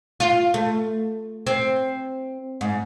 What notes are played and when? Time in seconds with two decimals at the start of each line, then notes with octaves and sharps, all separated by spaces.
0.20 F4
0.54 A3
1.47 C4
2.61 G#2